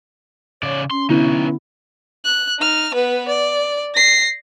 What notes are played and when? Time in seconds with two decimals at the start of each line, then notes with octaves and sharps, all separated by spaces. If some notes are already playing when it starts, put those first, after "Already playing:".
0.63 C#3 C#5 D5
0.91 C#4 C6
1.10 D3 B3 D#4 E4 B4
2.25 F#6
2.59 D#4 F6
2.94 B3 B4
3.28 D5
3.94 A#6 C7